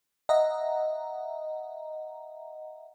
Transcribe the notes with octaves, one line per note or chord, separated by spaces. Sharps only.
D#5 E5 F#5 A#5